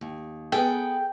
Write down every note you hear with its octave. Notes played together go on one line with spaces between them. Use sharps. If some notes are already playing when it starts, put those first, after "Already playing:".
D#2
B3 G#4 A4 G5